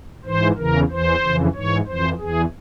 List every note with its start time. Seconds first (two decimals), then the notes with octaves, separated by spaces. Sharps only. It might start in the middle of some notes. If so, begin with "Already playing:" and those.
0.25 G#2 E3 C5
0.57 E2 C#3 E3 A#4
0.89 E2 E3 C5
1.22 F2 C#3 E3
1.54 G#2 E3 C#5
1.86 F2 E3 C5
2.19 E2 E3 G#4